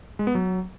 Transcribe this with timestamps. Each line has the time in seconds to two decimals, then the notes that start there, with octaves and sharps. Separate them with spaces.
0.19 G#3
0.27 B3
0.35 F#3